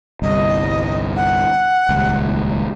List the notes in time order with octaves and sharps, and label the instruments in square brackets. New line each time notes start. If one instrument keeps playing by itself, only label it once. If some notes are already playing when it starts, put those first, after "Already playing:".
[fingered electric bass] G1 C2 [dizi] D#5
[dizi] F#5
[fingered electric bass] D#1 C#2